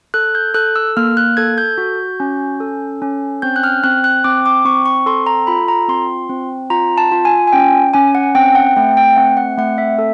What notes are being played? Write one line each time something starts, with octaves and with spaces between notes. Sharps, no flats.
A4 F#6
G6
A4 F#6
E6
A#3 F6
F#6
A4 G#6
G6
F#4
C#4
A4
C#4
C4 G6
F#6
F6
C4 F#6
F#6
C4 D6
D6
C4 C#6
C#6
A4 C6
A#5
F4 B5
A#5
C4 C6
C4
F4 A#5
A5
F4
G#5
G#5
C#4 G5
C#4 G#5
F#5
C4 G5
F#5
A3 G5
G5
C4 F#5
F#5
A3 F#5
E5
A4